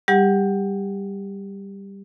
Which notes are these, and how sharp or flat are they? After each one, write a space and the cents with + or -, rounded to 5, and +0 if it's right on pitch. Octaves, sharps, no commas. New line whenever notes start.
G3 +0 G4 +25 F#5 +0